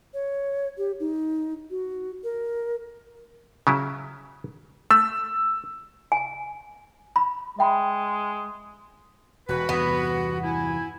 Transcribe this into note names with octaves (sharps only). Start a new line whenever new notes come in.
C#5
G4
D#4
F#4
A#4
C#3 F#3 E4
A3 E6
G#5
B5
G#3 E5 G5 B5
E1 F#4 B4
E2 G2 C3 B3
E4 G#5